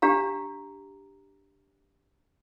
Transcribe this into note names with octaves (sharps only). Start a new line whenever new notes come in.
D4 G4 F5 A#5